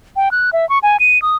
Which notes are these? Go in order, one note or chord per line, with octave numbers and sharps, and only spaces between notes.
G5
F#6
E5
C#6
G#5
D#7
D#6